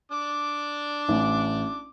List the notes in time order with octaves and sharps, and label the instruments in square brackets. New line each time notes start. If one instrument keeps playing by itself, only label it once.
[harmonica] D4 D6
[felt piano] A1